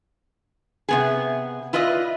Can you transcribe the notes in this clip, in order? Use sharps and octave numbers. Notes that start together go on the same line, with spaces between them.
C3 B3 G#4
E4 F4 B4 D5 D#5